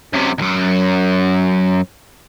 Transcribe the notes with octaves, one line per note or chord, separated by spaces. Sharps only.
F#2 C3
C#2 F#2